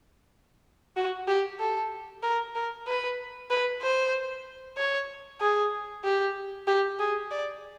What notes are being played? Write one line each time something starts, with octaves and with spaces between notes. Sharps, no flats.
F#4
G4
A4
A#4
A#4
B4
B4
C5
C#5
G#4
G4
G4
G#4
D5